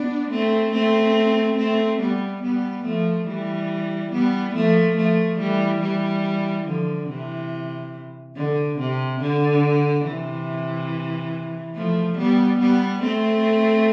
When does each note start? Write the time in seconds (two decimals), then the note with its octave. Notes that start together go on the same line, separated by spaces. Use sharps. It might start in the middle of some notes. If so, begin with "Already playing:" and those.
Already playing: B3 D4
0.31 A3 C4
0.73 A3 C4
1.58 A3 C4
2.00 G3 B3
2.43 G3 B3
2.85 F3 A3
3.27 E3 G3
4.12 G3 B3
4.54 F3 A3
4.97 F3 A3
5.39 E3 G3
5.81 E3 G3
6.66 D3 F3
7.09 C3 E3
8.36 D3
8.79 C3
9.21 D3
10.05 C3 E3
11.75 F3 A3
12.17 G3 B3
12.60 G3 B3
13.02 A3 C4